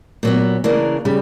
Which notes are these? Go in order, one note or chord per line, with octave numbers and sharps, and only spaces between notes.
A#2 F#3 B3
C#3 E3 A#3 D4 A#4
C#3 G3